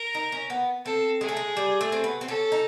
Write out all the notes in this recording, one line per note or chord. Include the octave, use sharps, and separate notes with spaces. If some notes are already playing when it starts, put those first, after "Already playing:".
Already playing: A#4
D#4
C#4
B3
C4 A4
G#3 G#4
A3
G#3
G3
A3
C4
B3
C4
C#4 A4
D#4